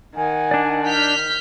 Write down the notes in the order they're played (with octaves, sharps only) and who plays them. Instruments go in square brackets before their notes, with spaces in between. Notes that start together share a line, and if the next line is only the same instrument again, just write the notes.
[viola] D#3 [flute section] F#5 G#5
[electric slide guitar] D4 D5
[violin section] F6 G6 B6